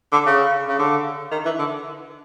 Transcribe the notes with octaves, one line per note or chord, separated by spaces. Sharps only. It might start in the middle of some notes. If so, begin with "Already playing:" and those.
D3
C#3
C#3
D3
D#3
E3
D3